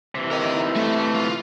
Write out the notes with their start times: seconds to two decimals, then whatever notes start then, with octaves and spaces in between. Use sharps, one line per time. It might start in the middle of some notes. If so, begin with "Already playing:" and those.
0.15 C3 E3
0.31 A#4 D#5
0.76 A3
1.15 F4